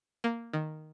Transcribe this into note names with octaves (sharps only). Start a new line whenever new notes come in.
A#3
D#3